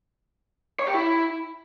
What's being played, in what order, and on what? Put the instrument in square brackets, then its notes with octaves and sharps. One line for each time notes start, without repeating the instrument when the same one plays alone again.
[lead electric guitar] C#5
G4
E4